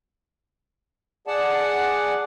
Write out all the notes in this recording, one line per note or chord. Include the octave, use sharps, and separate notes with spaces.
G#4 D5 F#5 A5